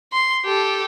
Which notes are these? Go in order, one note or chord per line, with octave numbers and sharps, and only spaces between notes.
C6
G4 A4